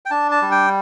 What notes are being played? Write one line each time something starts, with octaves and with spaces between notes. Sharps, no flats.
G5
D4 A5
A5
G3
G5